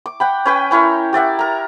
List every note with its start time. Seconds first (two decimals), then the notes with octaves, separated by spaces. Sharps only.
0.06 D6
0.20 F#5 G5 B5
0.46 C#4 B4 G5
0.71 C#4 E4 A#4 C#5
1.13 G4 D5 E5 F#5
1.39 A#4 A#5